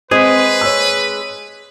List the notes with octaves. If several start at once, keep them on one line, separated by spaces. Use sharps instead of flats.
G#3 C4 G#4 B4
C#5 E6